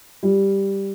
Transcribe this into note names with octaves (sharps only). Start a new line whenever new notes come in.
G3